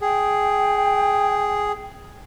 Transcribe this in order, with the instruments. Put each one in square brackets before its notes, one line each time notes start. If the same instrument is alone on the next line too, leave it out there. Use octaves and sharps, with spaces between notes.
[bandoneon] G#4 [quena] G5